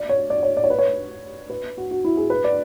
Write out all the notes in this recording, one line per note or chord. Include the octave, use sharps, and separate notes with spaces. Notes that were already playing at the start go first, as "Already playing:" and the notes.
Already playing: D5
C#5
D5
C#5
D5
C#5
B4
C#5
B4
F#4
F#4
E4
G#4
B4
D5